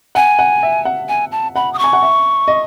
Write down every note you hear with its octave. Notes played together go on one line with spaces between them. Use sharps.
F#5 G#5
F#5
E5
F#5
G#5
A5
F#5 B5
D#6
C#6
G#5
F#5
E5
D#5